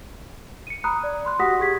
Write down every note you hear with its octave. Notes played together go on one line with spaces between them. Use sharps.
C#7 D#7
A#5 B5 D#6 F#6
D5
B5 C6 F#6
F#4 G4 F#5 D#6 A#6 B6
G4 G#4 G#6 B6